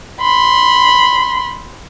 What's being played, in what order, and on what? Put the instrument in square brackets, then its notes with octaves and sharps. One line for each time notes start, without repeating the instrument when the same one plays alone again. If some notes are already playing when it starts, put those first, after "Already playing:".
[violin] B5 C6